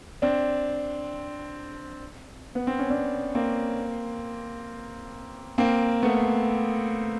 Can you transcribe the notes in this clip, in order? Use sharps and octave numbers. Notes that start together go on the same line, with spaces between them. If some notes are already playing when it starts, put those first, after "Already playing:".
C4 D4
B3
C4
C#4
C4 D4
A#3 C4
A#3 C4
A3 B3